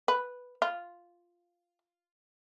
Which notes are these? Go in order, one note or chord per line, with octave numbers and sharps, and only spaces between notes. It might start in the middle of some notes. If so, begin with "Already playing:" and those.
B4
F4